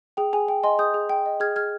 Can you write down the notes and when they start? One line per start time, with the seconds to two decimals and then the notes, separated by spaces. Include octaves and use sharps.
0.17 G#4 G5
0.33 G#4 G#5
0.48 G5
0.63 D#5 G#5 C6
0.79 G#4 D#6 G6
0.94 G#4
1.09 G5
1.26 D#5
1.40 G#4 F6 G#6
1.56 G#4 F6 G#6